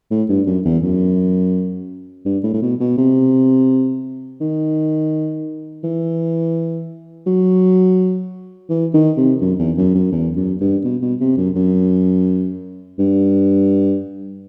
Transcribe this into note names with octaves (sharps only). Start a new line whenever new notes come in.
A2
G2
F#2
E2
F#2
G2
A2
A2
B2
B2
C3
D#3
E3
F#3
E3
D#3
C3
F#2
E2
F#2
F#2
E2
F#2
G2
B2
B2
C3
F#2
F#2
G2